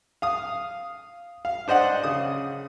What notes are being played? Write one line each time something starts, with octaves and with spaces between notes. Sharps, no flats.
F5 D#6
F5
D4 C5 D#5 F#5
C#3 D#6